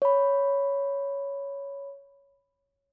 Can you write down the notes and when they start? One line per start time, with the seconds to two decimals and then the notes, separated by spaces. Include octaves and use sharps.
0.02 C#5 B5